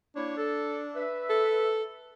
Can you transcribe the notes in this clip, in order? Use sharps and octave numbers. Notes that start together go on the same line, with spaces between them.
A#3 D4 E4 C#5
A4
B4 E5
A4